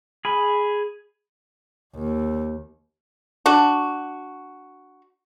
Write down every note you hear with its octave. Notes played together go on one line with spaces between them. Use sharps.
G#4 B5
D#2
D4 F#4